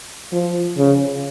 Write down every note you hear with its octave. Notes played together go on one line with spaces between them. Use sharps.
F3
C#3